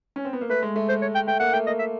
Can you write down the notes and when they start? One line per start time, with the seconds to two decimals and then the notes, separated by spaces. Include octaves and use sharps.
0.16 C#4
0.25 C4
0.33 B3
0.41 A#3
0.49 A3 B4
0.63 G#3
0.76 A3
0.89 C5
1.02 C#5
1.15 G5
1.27 A3 G5
1.40 A#3 F#5
1.53 A3 G5
1.67 A#3 D#5
1.79 E5